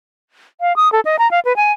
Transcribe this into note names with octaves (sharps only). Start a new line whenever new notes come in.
F5
D#6
A4
D#5
A#5
F5
B4
G#5